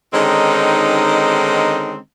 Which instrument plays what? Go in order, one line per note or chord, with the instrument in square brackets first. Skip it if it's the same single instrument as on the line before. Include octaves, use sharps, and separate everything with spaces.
[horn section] D3 D#3 G#3 C4 C#4 D#4